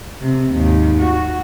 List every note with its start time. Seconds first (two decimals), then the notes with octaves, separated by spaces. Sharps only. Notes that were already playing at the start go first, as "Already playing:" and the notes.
0.21 C3
0.50 D#2 G#2
1.00 F#4